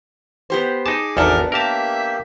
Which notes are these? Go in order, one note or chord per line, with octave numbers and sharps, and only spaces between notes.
B3 G4 C5
D#4 G#4 A5 D6
G#1 E2 B3 D4 D#4 A4 A#4
A#3 G4 A#4 E5 A5